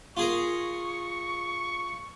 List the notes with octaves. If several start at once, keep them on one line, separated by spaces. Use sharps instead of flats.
F4 G#4 A#4 C#6